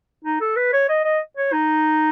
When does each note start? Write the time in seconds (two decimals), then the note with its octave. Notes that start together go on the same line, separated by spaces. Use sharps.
0.24 D#4
0.41 A4
0.56 B4
0.73 C#5
0.89 D#5
1.05 D#5
1.37 C#5
1.52 D#4